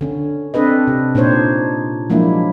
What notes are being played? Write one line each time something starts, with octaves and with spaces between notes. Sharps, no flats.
D3 C#4
C4 D4 A4 B4 D#5
C3
A#2 D4 D#4 C5 C#5
F3 F#3 G#3 A#3 D4 E4